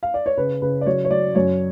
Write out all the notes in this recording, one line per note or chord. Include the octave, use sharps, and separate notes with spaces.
F5
D5
C#5
C#3 B4
C#3 B4
D5
F#3 C#5
C#5
F#3 D5
F#2 C#5